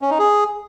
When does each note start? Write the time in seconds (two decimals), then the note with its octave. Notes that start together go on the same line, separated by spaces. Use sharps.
0.02 C#4
0.10 D#4
0.19 G#4